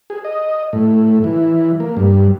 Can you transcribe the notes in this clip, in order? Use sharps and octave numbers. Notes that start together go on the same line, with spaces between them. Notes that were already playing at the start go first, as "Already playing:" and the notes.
G#4
D#5
A2
E3
A#3
G2